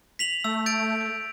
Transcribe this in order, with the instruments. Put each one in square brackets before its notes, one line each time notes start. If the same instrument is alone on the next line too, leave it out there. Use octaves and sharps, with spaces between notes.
[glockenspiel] B6 F7 F#7
[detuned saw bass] A3 [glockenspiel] E6
[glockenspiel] G6 A6 D7